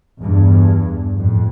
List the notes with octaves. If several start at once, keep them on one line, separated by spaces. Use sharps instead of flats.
E2 G2
F2 A2